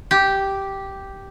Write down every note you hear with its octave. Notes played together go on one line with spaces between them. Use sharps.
G4